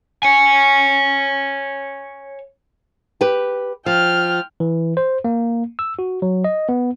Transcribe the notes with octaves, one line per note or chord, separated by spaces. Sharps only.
C#5 G#5
G4 B4
F3 G5 F6
E3
C5
A#3
E6
F#4
F#3
D#5
B3